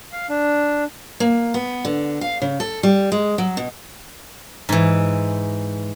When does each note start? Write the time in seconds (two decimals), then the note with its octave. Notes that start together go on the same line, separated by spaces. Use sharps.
0.12 F5
0.29 D4
1.20 A#3
1.54 B3
1.85 D3
2.21 F5
2.42 C#3
2.60 A4
2.83 G3
3.12 G#3
3.38 F#3
3.57 B2
4.69 G#2 E3